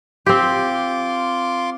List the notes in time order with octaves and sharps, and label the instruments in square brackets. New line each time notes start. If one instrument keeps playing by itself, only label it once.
[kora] C4 G4 [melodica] F4 C6 D6